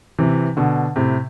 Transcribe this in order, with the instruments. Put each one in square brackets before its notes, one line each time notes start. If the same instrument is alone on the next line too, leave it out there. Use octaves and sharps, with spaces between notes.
[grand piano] C3 E3
B2 D3
A2 C3